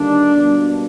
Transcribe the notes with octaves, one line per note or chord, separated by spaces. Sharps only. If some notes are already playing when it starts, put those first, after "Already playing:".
Already playing: D#2 D3 G3 A#3 D4
B2 G3 A#3